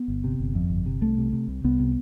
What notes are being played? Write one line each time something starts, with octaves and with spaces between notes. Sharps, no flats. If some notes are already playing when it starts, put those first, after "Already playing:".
Already playing: B3
G1
C3
G1
F2
G1
C3
C2 A3
C3
C3
C2
C2 B3
C3